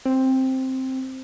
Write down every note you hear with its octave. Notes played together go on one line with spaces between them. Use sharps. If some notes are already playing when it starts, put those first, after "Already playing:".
C4